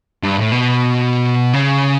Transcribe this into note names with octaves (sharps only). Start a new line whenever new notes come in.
G2
A2
B2
C#3